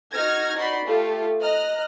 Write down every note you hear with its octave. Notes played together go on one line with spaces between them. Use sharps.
D#4 F#4 F6 G#6 A#6
D#4 F#4 D5 B5 C6
A3 F4 G4 A4
D#5 A#5 F6 F#6